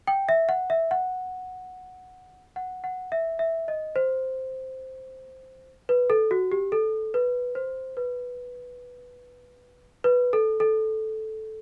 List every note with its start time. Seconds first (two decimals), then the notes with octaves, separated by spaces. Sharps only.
0.07 G5
0.29 E5
0.49 F#5
0.70 E5
0.91 F#5
2.56 F#5
2.84 F#5
3.12 E5
3.39 E5
3.68 D#5
3.96 C5
5.89 B4
6.10 A4
6.31 F#4
6.52 G4
6.72 A4
7.14 B4
7.55 C5
7.97 B4
10.04 B4
10.33 A4
10.60 A4